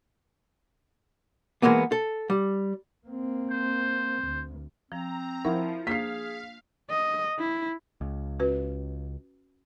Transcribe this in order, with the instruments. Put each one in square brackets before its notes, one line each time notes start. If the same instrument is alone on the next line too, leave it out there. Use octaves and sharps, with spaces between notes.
[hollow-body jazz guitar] E3 F3 G#3 A#3 B3
A4
G3
[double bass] A#3 C4
[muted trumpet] C5
[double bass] D2
[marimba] F3 [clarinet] C4 [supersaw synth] A#5
[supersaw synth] F3 [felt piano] E4 [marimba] A#4 F#5 C#6
[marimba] A#3 D4 [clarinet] G#4 [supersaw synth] F5 [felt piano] B6 C7
[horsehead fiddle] D#5
E4
[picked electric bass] C#2
[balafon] C#4 F#4 B4